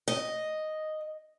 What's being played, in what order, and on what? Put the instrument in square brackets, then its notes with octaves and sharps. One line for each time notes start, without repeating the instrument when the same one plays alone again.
[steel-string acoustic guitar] D#5